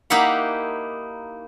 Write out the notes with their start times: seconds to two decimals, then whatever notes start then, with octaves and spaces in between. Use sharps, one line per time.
0.10 A#3 D#4 E4 G4 F#5 B5